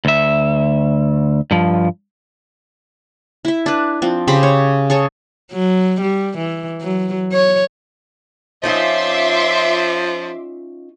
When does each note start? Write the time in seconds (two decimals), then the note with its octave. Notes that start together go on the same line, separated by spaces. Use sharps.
0.05 D2 E5
1.51 G2 F3
3.45 E4 E5
3.66 D4 B4
4.02 F3 C4
4.28 C#3 G4 C5 B5
4.43 C#5
4.90 G#4 A4 C#5
5.52 F#3
6.01 G3
6.38 E3
6.81 F#3
7.32 C#5
8.63 F3 C#4 D#4 F4 E5 C6 D6